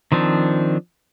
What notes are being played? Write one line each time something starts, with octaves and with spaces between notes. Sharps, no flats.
D#3 F3 C4 D4